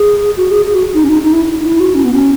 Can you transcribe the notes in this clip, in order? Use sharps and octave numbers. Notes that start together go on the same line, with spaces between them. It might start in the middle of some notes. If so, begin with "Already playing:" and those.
Already playing: G#4
F#4
G#4
G#4
F#4
D#4
C#4
D#4
D#4
E4
D#4
E4
F#4
C#4
B3
C#4